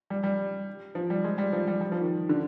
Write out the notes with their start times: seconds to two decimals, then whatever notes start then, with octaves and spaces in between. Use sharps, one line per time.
0.10 G3
0.24 G3
0.95 F3
1.10 G3
1.24 G#3
1.38 G3
1.53 F3
1.67 G3
1.81 G3
1.92 F3
2.00 D#3
2.29 D3